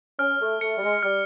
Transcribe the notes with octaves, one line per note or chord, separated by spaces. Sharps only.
C#4 F6
A3
A3 C#7
G3
G#3
G3 F6